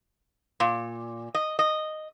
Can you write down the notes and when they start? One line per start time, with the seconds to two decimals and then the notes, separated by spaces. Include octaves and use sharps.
0.60 A#2
1.35 D#5
1.59 D#5